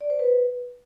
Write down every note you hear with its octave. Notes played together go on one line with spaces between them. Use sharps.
D5
C5
B4